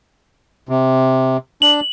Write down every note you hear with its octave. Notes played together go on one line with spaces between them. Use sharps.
C3
D4 F#7